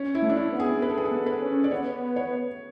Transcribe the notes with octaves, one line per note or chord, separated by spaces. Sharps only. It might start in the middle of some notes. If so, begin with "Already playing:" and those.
Already playing: C#4
E4
A3
D4
E4
B3
G#4
B4
A4
G#4
A4
B3
B4
C#4
D5
B3 C#5
C#5